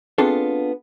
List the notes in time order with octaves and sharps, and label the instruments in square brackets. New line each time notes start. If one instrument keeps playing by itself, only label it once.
[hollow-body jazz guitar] B3 C4 D4 F4 G#4 A4